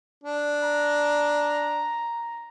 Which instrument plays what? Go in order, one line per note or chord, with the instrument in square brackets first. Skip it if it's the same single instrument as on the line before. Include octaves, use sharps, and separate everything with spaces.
[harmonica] D4
[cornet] A#5